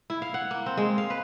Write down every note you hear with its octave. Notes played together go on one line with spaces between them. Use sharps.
E4
F5
F#5
A#3
C4
G#3
F5
B4